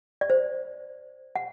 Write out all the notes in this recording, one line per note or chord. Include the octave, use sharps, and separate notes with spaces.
D5
C5
F#5